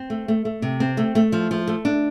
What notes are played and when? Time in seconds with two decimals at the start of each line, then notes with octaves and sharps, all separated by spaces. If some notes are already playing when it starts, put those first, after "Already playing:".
Already playing: C4
0.10 A3
0.28 A3
0.45 A3
0.62 C3
0.80 C4
0.97 A3
1.15 A3
1.32 F3
1.51 F3
1.67 A3
1.85 D4